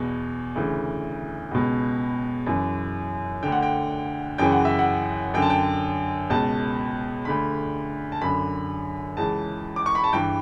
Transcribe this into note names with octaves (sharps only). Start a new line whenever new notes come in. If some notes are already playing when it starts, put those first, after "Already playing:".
Already playing: E2 B2
D2 C#3 E3
C#2 B2
F#2 E3
D2 D3 G5
F#5
G5
F#2 C#3 E3 G5
F#5
E5
F#5
F#2 D3 G5
A5
G5
C#2 B2 A5
D2 D3 B5
A5
F#2 D3 B5
C#2 C#3 E3 A5
D6
C#6
B5
A5
G2 E3 G5